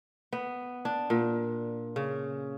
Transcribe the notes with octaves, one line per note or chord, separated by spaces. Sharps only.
B3
D4
A#2
C#3